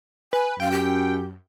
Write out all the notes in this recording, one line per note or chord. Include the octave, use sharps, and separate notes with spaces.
B4 G#5
F#2 F5 G5
G4